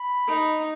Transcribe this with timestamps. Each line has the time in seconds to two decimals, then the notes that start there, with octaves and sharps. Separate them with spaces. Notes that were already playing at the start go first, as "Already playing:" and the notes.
Already playing: B5
0.28 D#4